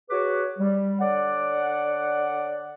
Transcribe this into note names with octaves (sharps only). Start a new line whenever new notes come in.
F#4 G#4 B4 C#5 D6
G3
D3 C#5 D5 F#5